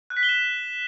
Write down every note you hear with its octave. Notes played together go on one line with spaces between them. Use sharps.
F#6
B6
G7
E7